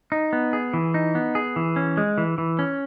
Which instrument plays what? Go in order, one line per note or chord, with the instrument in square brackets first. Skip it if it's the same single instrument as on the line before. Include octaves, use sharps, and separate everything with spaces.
[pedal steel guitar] D#4
B3
G#4
E3
D#4
B3
G#4
E3
C#4
G#3
E3
E3
C#4